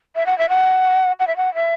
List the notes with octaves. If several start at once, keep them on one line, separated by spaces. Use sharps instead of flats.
E5
F#5
E5
F#5
F#5
E5
F#5
E5